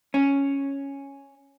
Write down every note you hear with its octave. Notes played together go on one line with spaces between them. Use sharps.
C#4